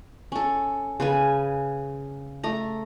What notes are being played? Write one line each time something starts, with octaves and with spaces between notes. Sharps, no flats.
C#4 A4
C#3 B4 G#5
A3 A#5